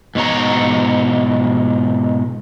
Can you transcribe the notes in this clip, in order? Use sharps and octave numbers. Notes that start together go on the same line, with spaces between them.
G#2 B2 C#5 A#5